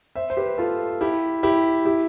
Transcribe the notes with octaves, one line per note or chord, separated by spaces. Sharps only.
C5 E5
C5
G4 B4
F4 A4
E4 G4
E4 G4
E4 G4